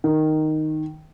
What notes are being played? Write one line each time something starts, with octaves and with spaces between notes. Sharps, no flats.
D#3